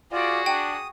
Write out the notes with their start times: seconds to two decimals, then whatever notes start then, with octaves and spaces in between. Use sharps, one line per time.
0.12 F4 F#4 G#4 D5
0.46 D4 G5 D#6